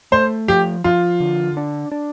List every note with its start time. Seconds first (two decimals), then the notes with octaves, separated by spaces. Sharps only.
0.12 A3 C5
0.48 F3 G4
0.84 F3 F4
1.20 D3
1.57 D4
1.92 D4